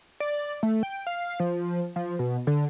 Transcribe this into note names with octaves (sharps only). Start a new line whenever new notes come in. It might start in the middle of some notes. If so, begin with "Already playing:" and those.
D5
A3
G5
F5
F3
F3
B2
D3